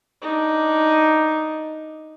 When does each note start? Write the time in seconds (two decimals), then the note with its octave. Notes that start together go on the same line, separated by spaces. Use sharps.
0.22 D4 D#4